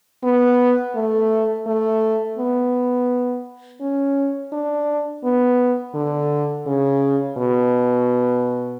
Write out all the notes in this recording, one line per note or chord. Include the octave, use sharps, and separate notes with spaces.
B3
A3
A3
B3
C#4
D4
B3
D3
C#3
B2